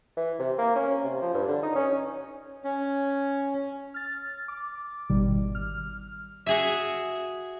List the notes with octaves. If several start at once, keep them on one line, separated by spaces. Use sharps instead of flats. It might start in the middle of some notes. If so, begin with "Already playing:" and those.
E3
C3
A#3
C#4
C3
F3
G2
D3
D#4
C#4
C#4
F6 A6
D6
G#1 B2 D#3 G3
F6
F#4 G#4 E5